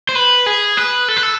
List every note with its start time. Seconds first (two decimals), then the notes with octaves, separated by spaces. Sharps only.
0.09 C5
0.15 B4
0.46 G#4
0.77 B4
1.08 A4
1.17 B4
1.23 A4